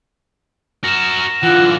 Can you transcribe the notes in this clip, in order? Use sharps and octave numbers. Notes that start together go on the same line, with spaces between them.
F#4 A#4 A#6 E7
D3 E3 F4 F#5